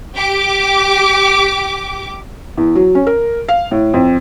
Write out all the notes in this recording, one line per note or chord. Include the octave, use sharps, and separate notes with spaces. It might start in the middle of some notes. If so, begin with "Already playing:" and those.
G4 D6
E2
F#3
C#4
A#4
F5
A2
F2